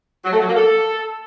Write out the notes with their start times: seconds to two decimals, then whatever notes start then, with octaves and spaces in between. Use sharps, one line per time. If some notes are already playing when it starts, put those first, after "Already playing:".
0.25 F#3
0.33 A3
0.41 F#3
0.49 A#3
0.56 A4